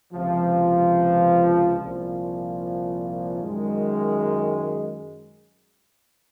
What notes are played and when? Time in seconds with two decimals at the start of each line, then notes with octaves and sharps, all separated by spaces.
0.13 C#2 C3 F3
1.77 C2 A#2 F3
3.40 F#2 D#3 G#3